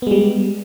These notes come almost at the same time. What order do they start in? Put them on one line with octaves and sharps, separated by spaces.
B3 G#3 G3